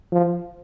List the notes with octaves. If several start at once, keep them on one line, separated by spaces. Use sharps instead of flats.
F3